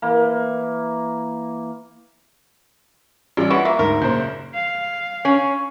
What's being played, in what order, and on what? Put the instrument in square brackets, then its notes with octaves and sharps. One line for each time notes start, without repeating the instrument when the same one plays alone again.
[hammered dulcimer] E3 A#3
[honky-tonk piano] A1 F4 [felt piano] G3 D5
[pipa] E3 C#4 [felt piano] F#5 [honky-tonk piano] C#6
[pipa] A#3 [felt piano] E5
[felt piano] D2 G#2 [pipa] A#4
[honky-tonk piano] F#1 A#2 C5 [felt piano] G6
[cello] F5
[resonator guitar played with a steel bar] C#4